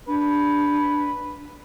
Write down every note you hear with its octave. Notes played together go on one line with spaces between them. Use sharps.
D4 B4